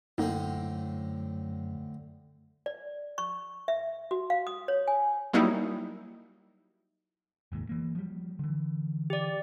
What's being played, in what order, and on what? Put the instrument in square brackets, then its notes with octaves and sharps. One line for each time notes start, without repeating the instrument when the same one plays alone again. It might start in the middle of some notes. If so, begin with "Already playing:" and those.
[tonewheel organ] F#2 [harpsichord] A2 D3 C4 [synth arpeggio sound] A#3 D#4
[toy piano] D5
C#6
E5
F#4
F5
D#6
C#5
G#5
[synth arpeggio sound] F#3 G3 A#3 D#4 E4
[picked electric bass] F1 D#2 G#2
E3 A#3
F3 G3
D3 E3
[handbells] G4 D5